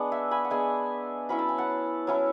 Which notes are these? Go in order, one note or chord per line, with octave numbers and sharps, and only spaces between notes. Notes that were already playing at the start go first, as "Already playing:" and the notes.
Already playing: G#3 B3 D4 F#5
E5 G#5
G#5 B5
F#5
G#3 B3 D4 E5 G#5
F#3 C#4 E4 B5
A5
G#5
F#5 A5
F#3 C#4 E4